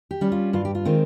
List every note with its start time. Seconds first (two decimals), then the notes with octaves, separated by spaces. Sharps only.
0.11 G4
0.21 G3 C#4
0.32 F4
0.53 G2 F4
0.65 G4
0.75 F4
0.85 D#3 G#3 C4